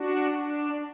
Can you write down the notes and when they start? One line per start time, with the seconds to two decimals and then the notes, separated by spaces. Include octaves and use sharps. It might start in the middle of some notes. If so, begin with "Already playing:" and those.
Already playing: D4 F#4
0.32 D4